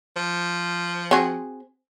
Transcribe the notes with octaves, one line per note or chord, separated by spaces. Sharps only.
F3
C4 F#4 G#4